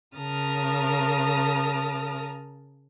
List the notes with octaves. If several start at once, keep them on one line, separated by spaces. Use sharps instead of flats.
C#3 A#4 A5 D#6 F6